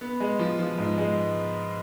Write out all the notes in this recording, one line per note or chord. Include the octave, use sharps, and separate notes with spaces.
B3
G#3
F3
F3
G#2
G#3